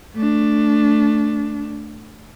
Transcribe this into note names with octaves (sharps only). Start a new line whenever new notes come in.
A3 D4